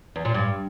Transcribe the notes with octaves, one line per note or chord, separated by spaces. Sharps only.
E2
A#2
G2